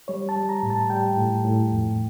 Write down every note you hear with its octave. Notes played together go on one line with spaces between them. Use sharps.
G3 C#5
A5
G3
A#5
A2
A5
G3 G5
A2
A2
F2